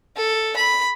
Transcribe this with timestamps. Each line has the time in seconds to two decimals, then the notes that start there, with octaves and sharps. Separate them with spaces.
0.17 A4
0.56 B5